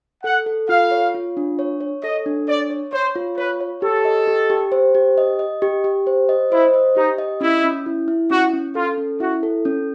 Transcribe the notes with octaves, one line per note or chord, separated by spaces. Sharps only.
A4 F#5
A4
F4 F5
C#5
F4
D4
C#5
C#5
A4 D#5
D4
C#5 D5
C#5
C5 C#5
F4
B4 C#5
C#5
G4 A4
D#5
G4
G4
C5
G4
D#5
D#5
G4
G4
C5
D#5
E4 C5
D#5
D#4 G4
D#5
C#4 E4
C#4
E4
E4
C#4 F#4
C#4
F4 A4
C#4
E4 F#4
A4
C#4